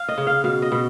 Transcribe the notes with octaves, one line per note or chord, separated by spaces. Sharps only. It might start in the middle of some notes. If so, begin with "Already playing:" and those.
Already playing: F5
D#5
C#3
F5
B2 F5
D#5
B2